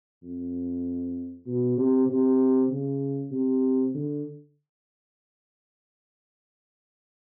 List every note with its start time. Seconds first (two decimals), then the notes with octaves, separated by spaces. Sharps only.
0.23 F2
1.46 B2
1.78 C3
2.09 C3
2.70 C#3
3.32 C3
3.94 D3